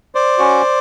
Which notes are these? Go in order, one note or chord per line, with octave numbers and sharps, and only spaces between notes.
C5 D5
C#4 F#4